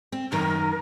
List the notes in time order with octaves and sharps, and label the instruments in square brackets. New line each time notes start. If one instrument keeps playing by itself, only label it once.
[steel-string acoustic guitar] C4
[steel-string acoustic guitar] F#2 D#3 [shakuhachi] A#4